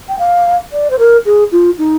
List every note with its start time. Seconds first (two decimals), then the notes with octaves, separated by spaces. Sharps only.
0.09 G5
0.19 F5
0.72 D5
0.90 C5
0.99 A#4
1.25 G#4
1.52 F4
1.78 D#4